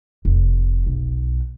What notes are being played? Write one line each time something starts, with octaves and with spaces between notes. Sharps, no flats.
F1
B1